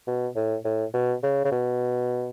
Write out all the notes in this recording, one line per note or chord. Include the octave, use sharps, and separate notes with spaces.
B2
A2
A2
B2
C#3
C#3
B2